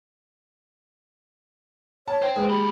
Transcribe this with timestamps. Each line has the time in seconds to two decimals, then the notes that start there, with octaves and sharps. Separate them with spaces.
2.08 C#5 A5
2.22 C5 G5
2.36 G#3 G#4 B4
2.50 D#2 G4 B5